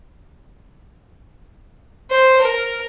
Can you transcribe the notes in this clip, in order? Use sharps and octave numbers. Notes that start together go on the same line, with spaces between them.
C5
A#4